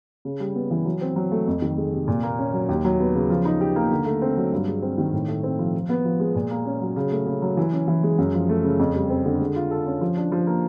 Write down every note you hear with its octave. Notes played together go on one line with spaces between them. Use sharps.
C#3
G3
B3
E3
F#3
C4
F#3
A3
F2
D#3
G#3
C3
A#2
A#3
C#4
F#3
D#2
F#3
B3
C#3
F3
D#4
G4
A#3
D3
A3
C4
F#3
G2
G#3
C4
D#3
A2
A3
C4
F3
F3
B3
F3
G#3
A#2
A#3
C#4
F#3
C#3
A3
C#3
F#3
E3
C#4
E3
G#3
F#2
F3
A3
C#3
F2
G3
C4
D3
G#3
F4
A4
C#4
F3
D4
F3
A#3